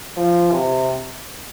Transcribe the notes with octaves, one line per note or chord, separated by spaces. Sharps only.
F3
C3